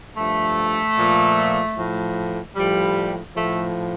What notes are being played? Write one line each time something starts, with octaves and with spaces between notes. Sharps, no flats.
G2 F3 A3
A#2 F3
A2 F3
A2 F3 G3
A2 F3 A3